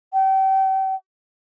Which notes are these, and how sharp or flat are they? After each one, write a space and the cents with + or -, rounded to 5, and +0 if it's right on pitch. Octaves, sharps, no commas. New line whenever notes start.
G5 -35